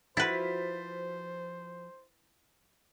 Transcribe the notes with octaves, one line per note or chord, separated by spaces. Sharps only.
F3 E4 F#4 B4 C5 A6 B6